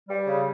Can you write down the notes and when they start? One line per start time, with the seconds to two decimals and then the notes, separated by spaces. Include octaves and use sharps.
0.09 G3
0.27 C#3